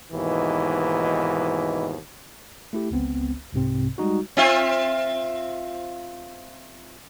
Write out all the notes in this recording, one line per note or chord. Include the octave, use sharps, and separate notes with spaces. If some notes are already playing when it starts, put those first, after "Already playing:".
D#2 G#2 B2 E3
A3 E4 G4
G1 C#2 B3 C4
C2 G#2 C3 C4
G3 G#3 D#4 F#4
C4 F4 E5